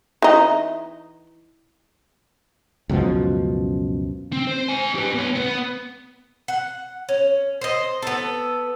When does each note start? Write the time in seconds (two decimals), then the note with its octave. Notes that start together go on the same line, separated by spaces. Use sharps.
0.22 E3 D#4
2.89 C#2 F#2 B2 F3
4.33 C4
4.47 C5
4.69 C5 G#5
4.95 G4 B4
5.14 B3 C#5
5.35 B3 B4
6.48 F#5
7.09 C#4
7.61 C5 D#5
8.02 B3 A4